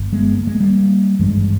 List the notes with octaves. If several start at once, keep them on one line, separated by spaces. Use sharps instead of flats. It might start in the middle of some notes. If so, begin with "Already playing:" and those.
Already playing: G1
G#3 B3
A#3
G#3
G3 A#3
G#1 G2 E3 G#3